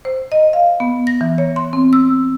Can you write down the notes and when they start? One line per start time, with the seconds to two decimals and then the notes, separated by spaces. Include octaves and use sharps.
0.05 C5
0.32 D#5
0.53 F5
0.80 B3
1.07 A#6
1.21 E3
1.38 C#5
1.56 C6
1.73 C4
1.93 E6